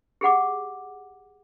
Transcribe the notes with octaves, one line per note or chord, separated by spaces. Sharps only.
G4 G#4 F#5 D6